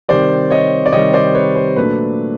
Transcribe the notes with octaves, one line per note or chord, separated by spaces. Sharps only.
C3 D#3 G3 C5 D5
C#5 D#5
D5
C3 D#3 G3 C#5 D#5
C5 D5
B4 C#5
C5
A#2 F#3 A3 D4 B4